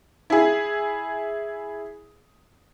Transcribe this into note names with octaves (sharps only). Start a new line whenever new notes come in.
E4 G#4